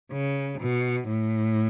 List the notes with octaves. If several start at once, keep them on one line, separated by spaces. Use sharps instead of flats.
C#3
B2
A2